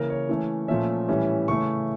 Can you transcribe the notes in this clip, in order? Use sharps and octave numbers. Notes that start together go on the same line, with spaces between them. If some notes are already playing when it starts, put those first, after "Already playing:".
Already playing: C#3 E3 A#3 C#4 A#4
C#5
E3 A3 C#4
A#2 F3 A3 C#4 E5
A2 E3 G3 C#4
C#3 E3 A3 C#4 C#6